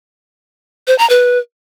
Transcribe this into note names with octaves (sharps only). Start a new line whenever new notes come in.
C5
A#5
B4